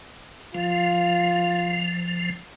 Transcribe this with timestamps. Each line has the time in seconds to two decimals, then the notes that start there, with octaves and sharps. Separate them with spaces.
0.55 F3 F4